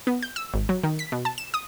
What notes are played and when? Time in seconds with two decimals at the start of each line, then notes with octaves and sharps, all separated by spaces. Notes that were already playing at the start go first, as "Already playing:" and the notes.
0.07 B3
0.23 G6
0.36 E6
0.54 G#1
0.69 F#3
0.83 D#3
0.99 B6
1.12 B2
1.25 A5
1.38 E7
1.54 D#6